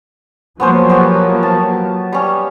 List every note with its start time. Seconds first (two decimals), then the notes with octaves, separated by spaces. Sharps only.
0.60 F3 F#3 A#3 B3 C#4 C5
0.89 B3 G4
1.43 A5
2.13 G3 C#4